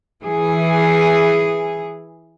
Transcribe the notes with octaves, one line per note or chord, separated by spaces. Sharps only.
E3 G#4